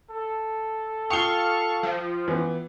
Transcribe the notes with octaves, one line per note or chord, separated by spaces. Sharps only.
A4
F4 F5 G5 C#6 D#6 C#7 G7
F3
E3 B3